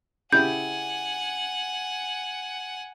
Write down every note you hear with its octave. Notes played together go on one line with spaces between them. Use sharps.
C#3 E4 G4 F#5 G#5 G6